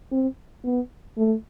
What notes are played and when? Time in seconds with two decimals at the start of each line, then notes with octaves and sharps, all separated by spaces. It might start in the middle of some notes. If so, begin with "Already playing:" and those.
0.12 C4
0.64 B3
1.17 A3